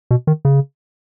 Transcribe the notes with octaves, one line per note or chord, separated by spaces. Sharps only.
B2
D#3
C#3